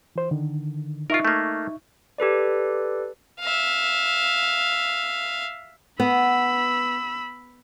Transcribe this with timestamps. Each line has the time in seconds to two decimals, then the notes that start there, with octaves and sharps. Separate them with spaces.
0.16 E3 C5
0.31 D3 D#3
1.10 D#4 F4 A#4 E5 C#6
1.25 A3 A#3
2.18 G4 A4 B4 D5
3.40 E5 F5
6.00 B3 B5 E6